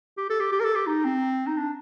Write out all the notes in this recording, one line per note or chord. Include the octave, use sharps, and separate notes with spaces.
G4
A4
G4
G4
A#4
A4
G4
D#4
C4
D#4
D4